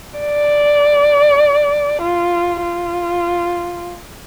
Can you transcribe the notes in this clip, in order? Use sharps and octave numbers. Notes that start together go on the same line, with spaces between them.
D5
F4
F4